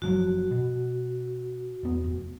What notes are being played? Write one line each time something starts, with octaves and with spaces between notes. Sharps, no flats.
F#1 F3 F#3 F#4
B2
E2 B3
F1